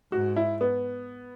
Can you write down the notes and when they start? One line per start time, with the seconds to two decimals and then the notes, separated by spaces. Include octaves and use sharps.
0.12 G#2 F#4
0.36 E4
0.61 B3